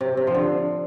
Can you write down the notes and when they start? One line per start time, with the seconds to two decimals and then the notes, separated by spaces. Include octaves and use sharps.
0.01 C3
0.17 C3
0.27 F3
0.34 D3